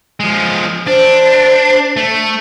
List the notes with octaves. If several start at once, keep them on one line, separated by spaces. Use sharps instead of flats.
F3 G#3
D4 C5
A3